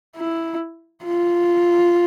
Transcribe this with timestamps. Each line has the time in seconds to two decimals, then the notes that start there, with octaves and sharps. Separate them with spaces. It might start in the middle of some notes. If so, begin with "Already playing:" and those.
0.17 E4
1.04 F4